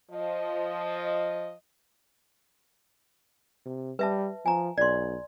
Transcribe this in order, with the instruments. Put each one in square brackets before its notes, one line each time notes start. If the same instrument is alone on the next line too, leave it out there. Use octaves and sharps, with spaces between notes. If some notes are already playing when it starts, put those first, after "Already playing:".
[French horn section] F3 D#5
[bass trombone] C3
[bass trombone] G3 [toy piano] B4 E5 A5
[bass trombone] F3 [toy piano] G#5 A#5
[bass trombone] B1 [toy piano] D5 C6